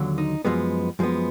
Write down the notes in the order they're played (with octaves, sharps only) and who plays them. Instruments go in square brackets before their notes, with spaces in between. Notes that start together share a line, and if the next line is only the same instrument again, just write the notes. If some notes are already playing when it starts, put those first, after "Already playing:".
Already playing: [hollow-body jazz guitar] D#2 D3 F#3
D#4
F#2 F3 G#3 B3
F#2 F3 G#3 B3